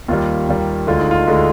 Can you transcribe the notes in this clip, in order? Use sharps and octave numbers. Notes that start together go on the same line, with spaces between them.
D#2 D#3 G3 F4
D#2 D#3 G3
D2 D3 G#3 F4
D#4
F4
D2 D3 G#3